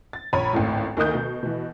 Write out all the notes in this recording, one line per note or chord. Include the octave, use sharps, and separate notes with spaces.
A6
A#1 C#5 A#5 B5 D#7
G#1 C#2 A2
D2 D#3 A#3 D#5 D#6 G6
B2
B2 E3